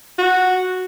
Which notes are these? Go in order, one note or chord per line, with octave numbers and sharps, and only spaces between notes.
F#4